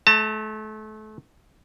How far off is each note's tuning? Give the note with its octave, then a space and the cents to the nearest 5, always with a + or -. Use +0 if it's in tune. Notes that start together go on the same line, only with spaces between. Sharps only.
A3 -30 A5 +30